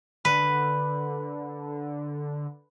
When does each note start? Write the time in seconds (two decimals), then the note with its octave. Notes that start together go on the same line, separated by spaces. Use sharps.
0.25 D3 B4